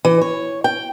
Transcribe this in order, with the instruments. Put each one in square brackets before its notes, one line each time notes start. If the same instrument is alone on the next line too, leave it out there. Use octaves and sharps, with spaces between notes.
[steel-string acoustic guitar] E3
C#5
G5